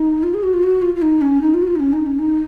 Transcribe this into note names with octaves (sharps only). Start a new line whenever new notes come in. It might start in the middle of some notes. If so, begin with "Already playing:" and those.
Already playing: D#4
F4
G#4
F#4
F4
F#4
F4
F4
D#4
C#4
D#4
F4
F#4
F4
D#4
C#4
D#4
C#4
D#4